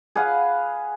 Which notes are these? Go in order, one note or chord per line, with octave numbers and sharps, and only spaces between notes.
G#4 B4 F5 F#5